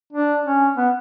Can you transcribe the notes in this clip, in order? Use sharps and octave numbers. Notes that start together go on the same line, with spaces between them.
D4
C#4
B3